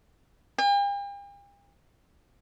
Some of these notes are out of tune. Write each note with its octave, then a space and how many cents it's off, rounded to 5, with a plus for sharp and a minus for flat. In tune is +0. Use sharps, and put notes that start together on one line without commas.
G5 +45